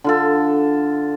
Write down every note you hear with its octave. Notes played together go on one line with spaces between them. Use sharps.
D3 F4 A4